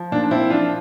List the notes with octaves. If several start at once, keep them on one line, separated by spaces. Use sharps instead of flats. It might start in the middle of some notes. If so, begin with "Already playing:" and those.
Already playing: F3
A#2 D4
D4
A#2 C4 E4
F3 D4 F4